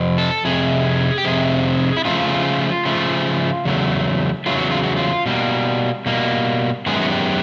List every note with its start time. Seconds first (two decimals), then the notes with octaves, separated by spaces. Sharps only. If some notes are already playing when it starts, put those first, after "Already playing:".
Already playing: F2 C3
0.18 A4
0.45 F2 C3 G#4
1.18 G4
1.25 F2 C3 G#4
1.97 E4
2.05 C#3 F3 A3 F4
2.85 C#3 F3 A3
3.65 E2 C#3 F#3 A3
4.46 E2 C#3 F#3 A3 F4
4.58 F#4
4.71 F4
4.84 F#4
4.97 F4
5.26 B2 G3 A#3
6.06 B2 G3 A#3
6.86 F#2 D#3 G#3 B3 G#4
6.95 G4
7.02 F#4
7.10 G4